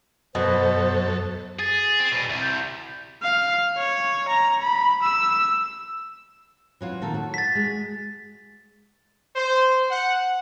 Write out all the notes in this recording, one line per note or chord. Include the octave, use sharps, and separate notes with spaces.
F#2 B2 A4 C5
G#4 A6
C4
E2 B2
C2
G6
F5
C#5
A#5
B5
E6
E3 F#3 F4
A#2 D#3 A4
F#4
A6 B6
G#3
C5
F#5